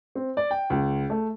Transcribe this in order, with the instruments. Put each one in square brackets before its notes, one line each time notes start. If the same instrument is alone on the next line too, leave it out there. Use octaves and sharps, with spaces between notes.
[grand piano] C4
D5
G5
C#2
A3